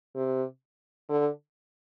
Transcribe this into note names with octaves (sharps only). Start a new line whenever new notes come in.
C3
D3